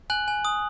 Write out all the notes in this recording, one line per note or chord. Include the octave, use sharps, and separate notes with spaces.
G#5 F#6 F#7
G#5
D#6